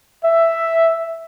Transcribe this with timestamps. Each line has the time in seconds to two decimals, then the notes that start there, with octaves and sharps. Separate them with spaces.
0.25 E5